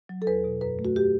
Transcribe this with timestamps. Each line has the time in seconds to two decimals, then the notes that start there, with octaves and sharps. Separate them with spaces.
0.09 F#3
0.22 A4
0.27 E2 B4
0.44 B2
0.61 F#2 B4
0.79 A3
0.85 F#4
0.96 G4